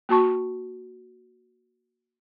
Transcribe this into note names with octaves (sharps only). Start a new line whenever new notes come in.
A#3 F#4 A5 C#6